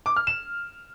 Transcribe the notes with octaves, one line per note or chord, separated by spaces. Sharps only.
D6
F6
E7